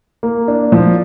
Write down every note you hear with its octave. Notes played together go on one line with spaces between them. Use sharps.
A#3
D4
F3